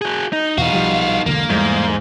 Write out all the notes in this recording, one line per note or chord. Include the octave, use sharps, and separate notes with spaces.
F#4 G#4
D#4
E2 B2 D#4 F#4 F5
B1 F3 G3
E1 B1 D3 A#3
E2 G#2 G3 A3